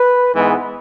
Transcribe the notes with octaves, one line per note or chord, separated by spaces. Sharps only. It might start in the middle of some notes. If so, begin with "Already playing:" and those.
Already playing: B4
G#2 E3 G#3 B3